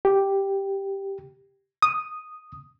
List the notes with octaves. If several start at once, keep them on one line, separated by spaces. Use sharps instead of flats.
G4
D#6